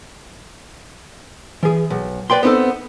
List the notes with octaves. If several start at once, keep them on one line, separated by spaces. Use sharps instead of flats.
E3 G#4
B1
B4 D5 G5 C6
B3 C4 D#4 F4 A4